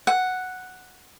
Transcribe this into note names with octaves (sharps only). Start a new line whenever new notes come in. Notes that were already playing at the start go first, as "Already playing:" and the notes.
F#5